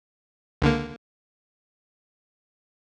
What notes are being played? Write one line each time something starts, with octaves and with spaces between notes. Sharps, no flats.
C#2 D3 A#3